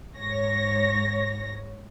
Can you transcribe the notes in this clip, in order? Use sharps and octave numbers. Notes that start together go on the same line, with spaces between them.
G#2 C#5 A#6